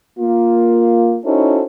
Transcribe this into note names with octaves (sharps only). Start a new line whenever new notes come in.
A#3 F4
C#4 D#4 E4 F#4 A4 C5